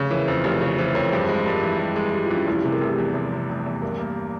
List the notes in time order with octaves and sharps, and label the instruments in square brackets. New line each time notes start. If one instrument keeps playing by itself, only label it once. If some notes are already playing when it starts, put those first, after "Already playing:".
Already playing: [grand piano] F1 C#3
[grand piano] E3 [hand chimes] A#4 C#5
[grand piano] F2 [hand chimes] G#4 C5
[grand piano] F1 [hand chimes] G4 A#4
[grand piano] C#3
[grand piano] E3 [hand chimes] G#4 C5
[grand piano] F2 [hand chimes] A#4 C#5
[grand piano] G2 [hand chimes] G#4 C5
[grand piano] G#3
[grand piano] G2 [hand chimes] G4 A#4
[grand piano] E3
G2
G#3
[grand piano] G2 [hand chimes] G4
[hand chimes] F4
[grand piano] E3
[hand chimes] C#4
[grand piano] F1 [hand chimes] E4
[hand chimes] G4
[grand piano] C3 [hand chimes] G#4
[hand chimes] G4 A#4
[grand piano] F1 [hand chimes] G#4
[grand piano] E2
F1
C3
F1
E2
[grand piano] G2 [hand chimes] G4 A#4
[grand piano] A#3